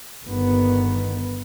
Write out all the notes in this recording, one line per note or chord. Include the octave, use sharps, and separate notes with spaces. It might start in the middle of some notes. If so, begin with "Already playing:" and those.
G1 D#3 B3